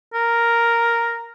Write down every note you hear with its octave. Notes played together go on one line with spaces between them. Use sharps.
A#4